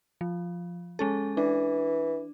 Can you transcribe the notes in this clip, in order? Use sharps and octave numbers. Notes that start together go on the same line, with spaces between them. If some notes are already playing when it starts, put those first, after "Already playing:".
F3
G#3 C#4 A4
E3 D4